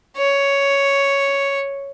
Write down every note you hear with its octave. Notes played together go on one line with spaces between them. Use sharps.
C#5